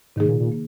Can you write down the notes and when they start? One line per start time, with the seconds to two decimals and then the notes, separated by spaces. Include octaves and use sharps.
0.16 G#2 C3 D#3 A#3 D#4 G#4
0.28 A#2
0.40 A#2
0.52 A#3